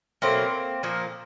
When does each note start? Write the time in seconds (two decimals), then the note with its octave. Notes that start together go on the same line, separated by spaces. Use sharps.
0.22 B2 F#3 A3 A#3 C4
0.83 A#2 F3 A#3